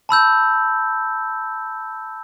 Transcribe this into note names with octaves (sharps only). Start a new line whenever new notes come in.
A5 B5 E6 G6